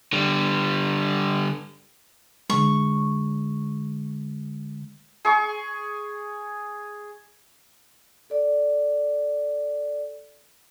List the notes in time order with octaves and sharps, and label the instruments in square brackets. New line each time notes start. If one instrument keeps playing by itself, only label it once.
[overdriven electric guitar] D3 G3
[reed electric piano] D3 G#3 [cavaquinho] C#6
[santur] G#4 C#6
[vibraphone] A4 D5